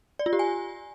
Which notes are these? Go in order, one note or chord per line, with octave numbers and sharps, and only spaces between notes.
D5
F4
G4
G#5